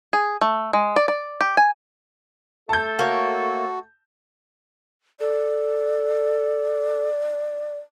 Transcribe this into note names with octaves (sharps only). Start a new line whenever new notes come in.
G#4
A3
G#3
D5
D5
G4
G#5
A3 A4 A5 G6
A#3 F#4 C#5
A4 D5